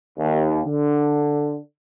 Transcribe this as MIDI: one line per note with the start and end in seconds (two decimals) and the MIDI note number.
0.18 0.59 39
0.65 1.57 50